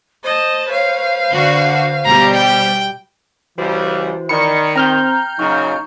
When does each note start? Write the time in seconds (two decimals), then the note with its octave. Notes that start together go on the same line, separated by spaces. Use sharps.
0.24 C5 D#5 A5
0.69 B4 C#5 F5
1.31 D3 F#4
2.05 B2 G3 G4 A#5
2.33 G5
3.58 C#2 E3 G3 F#4 C5
4.29 D#3 D5 A#5 B5 C#7
4.76 C4 G5 A#5 F6 G6
5.39 A#2 C#3 F#3 D#4 C#6